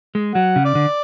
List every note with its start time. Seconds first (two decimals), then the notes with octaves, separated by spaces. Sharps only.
0.15 G#3
0.35 F#3 F#5
0.56 C#3
0.65 D5
0.75 D3